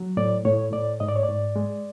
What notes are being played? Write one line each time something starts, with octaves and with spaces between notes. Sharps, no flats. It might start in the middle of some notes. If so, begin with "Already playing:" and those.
Already playing: F#3
A2 D5
A2 C#5
A2 D5
G#2 D#5
D5
C#5
D5
G#2
G#3